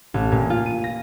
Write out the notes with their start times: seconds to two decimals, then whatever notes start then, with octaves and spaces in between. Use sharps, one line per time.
0.14 A1
0.32 A#2
0.50 F4
0.66 D#7
0.84 A#6